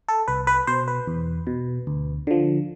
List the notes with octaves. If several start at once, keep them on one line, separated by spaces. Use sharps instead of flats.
A4
C2 B4
B4
B2 C5
B4
E2
B2
D2
D3 F3